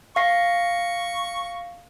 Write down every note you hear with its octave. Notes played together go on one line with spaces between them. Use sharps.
F5 C#6 A#6 C7